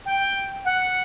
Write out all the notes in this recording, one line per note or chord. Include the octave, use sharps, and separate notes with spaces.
G5
F#5